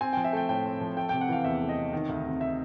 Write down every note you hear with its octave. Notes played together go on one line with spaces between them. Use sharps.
C4 G#5
F3 G5
E5
A3 G5
A2 G5
C4
F3
A3 G5
C3 G5
F#5
E3 F5
E2 E5
A3
D#5
C3
D#3
D2
C3
E5